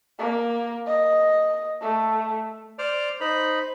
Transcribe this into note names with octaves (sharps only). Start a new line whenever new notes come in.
A#3
D#5
A3
C5 D5 F6
D#4 C5 B5